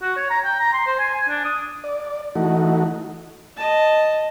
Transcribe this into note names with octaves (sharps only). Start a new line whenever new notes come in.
F#4
C#5
A#5
G5
A#5
C6
C5
G#5
G#5
D4
D#6
D5
E3 A3 D#4 F#4
D#5 A5